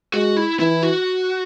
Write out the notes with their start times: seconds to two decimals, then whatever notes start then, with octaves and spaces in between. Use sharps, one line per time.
0.13 G#3 F#4
0.37 E4
0.60 E3 E4
0.83 F#4